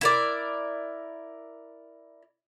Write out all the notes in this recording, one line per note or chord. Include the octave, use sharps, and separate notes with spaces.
E4 A#4 D5